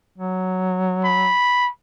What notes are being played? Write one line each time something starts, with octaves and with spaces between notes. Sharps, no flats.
F#3
B5